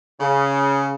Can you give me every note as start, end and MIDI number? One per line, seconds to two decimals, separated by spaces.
0.20 0.95 49